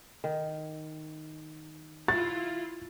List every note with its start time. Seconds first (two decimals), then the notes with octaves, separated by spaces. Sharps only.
0.24 D#3
2.08 E4 F4 A6